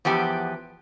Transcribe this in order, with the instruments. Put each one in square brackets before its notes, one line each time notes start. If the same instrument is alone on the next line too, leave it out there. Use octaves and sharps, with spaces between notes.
[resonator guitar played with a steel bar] E2 F3 B3 G4